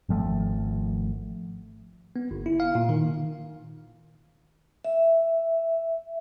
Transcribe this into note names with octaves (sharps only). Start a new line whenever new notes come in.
G#1 F3 A3
B3
G1
E4
F5
A#2
D#3
E5